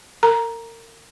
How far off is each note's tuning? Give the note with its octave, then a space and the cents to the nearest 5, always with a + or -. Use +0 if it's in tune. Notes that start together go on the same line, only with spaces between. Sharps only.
A#4 -35 A#5 +10